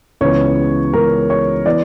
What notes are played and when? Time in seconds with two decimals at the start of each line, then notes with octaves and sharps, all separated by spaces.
0.21 C#2 C#3 E3 B3 C#5
0.93 C#2 C#3 E3 B3 A#4
1.30 C#5
1.66 E3 B3 D5